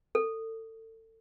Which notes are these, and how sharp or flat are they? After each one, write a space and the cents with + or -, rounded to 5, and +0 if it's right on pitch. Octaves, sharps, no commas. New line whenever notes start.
A4 +30